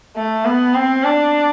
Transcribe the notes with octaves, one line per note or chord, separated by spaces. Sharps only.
A3
B3
C4
D4